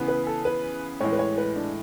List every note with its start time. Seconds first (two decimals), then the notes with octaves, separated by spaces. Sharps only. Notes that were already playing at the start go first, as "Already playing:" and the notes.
Already playing: C#3 E3 B3
0.08 B4
0.27 A4
0.45 B4
1.01 A2 E3 G#3 C#5
1.13 B4
1.19 C#5
1.38 B4
1.56 D4